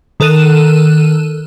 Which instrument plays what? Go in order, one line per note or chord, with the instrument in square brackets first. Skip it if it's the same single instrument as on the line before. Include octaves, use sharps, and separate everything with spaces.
[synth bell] D#3 A4 A#4 F#6 D#7 E7